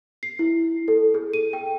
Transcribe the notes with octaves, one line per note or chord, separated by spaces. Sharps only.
C7
E4
A4
G#4
D#7
G5